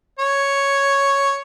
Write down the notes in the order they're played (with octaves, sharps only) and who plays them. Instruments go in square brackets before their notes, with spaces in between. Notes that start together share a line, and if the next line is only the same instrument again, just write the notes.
[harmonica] C#5